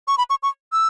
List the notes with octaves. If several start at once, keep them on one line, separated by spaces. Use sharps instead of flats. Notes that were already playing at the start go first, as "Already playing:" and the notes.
C#6
B5
C#6
C#6
E6